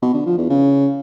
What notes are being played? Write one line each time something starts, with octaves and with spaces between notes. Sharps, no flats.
B2
D3
F3
E2
C#3